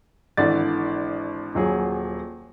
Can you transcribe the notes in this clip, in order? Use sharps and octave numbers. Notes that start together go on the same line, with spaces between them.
G#1 D3 E3 D5 A6
D#1 F#3 G#4